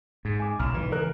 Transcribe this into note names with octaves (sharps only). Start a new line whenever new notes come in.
G#2
G#5 D6
B1 F6 E7
G#1 E3
F#1 A#4 F#6